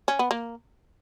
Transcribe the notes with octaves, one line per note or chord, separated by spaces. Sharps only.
C#4
B3
A#3